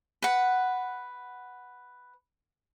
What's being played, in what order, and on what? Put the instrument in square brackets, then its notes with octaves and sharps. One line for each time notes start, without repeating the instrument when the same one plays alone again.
[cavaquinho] B4 F#5